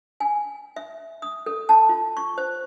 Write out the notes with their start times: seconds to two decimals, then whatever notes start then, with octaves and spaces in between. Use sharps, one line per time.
0.20 G#5
0.76 E5
1.22 D#6
1.46 A4
1.69 A5
1.89 F4
2.17 C#6
2.38 C5